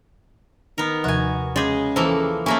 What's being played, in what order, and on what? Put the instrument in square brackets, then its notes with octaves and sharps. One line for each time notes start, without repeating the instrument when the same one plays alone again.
[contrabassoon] D#3 [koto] B3 A#4
[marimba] D#2 C3 F3 [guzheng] F#4 G#5
[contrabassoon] C#3 [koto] G#3 G#4 [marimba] D6 G6 A6
[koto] E3 F3 A#3 [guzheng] A4 [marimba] C5
[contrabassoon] D#2 [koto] A3 A#3 E4 [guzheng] C#4 [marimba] G#5 C#6